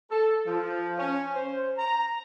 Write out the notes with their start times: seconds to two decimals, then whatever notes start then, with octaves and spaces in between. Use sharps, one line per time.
0.11 A4
0.46 F3
0.98 C#4
1.35 C5
1.78 A#5